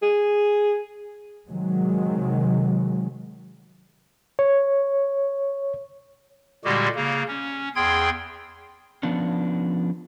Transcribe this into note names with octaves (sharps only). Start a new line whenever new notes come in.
G#4
C3 D#3 F#3 G#3
C#5
A#2 D3 G3 G#3 F#4 G4
C#3 A#3
C#4
E2 G#4 G5 C6 G#6
F3 B3 C#4 D4